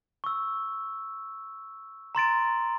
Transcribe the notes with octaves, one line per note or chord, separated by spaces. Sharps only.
C#6 E6
A#5 C6 A6 D7